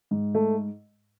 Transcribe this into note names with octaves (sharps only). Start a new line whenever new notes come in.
G#2
A3